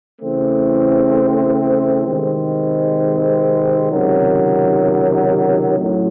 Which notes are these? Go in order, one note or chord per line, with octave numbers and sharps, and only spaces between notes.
C#3 E3 A3 C4
C3 D#3 G#3 C4
C#2 C3 D#3 F#3
A1 A2 F#3